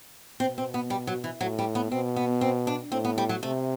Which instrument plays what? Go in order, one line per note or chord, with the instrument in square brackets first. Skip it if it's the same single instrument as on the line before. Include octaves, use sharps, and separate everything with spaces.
[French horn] B2 [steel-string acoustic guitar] C4
[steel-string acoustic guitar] C4
B3
G3
F#3
E3
[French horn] A2 [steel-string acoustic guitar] F#3
[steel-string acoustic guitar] G3
B3
[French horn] B2 [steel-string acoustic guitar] C4
[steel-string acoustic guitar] B3
C4
D4
[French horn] A2 [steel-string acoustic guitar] C4
[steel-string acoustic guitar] B3
G3
F#3
[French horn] C3 [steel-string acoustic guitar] A3